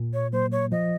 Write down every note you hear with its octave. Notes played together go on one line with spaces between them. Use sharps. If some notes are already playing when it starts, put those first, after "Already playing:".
Already playing: A#2
C#5
F#3 A#3 C5
C#5
F3 D#5